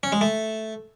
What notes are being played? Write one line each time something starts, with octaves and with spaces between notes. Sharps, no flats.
C#4
G#3
A3